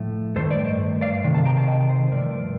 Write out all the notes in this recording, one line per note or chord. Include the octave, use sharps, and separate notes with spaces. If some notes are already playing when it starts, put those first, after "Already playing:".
Already playing: A2 F3 A3
G2 D#3 A3 A4 C5
A#4 D5
C5 D#5
D5 F5
C3 D#3
F5 A5
G5 A#5
F5 A5
D#5 G5
C5 D#5
G2 F3 A3 A#4 D5